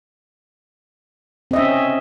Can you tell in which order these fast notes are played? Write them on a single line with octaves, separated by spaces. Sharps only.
C4 D#5 E5 C#4